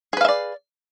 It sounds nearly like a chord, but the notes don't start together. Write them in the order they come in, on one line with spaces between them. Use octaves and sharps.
G#4 B4 F5 E5 D5